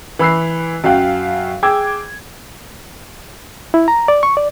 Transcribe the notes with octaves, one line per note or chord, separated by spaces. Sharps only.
E3 B5 E6 F#6 C7
F#2 F#3 F#4 F5 G5 F#6
G#4 G5 D6 E6 G#6
E4
A#5
D5
C#6
D5